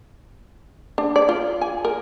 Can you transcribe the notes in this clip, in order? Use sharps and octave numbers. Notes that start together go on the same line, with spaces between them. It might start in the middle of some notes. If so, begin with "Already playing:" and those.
D4
D5
F4
G#5
A#4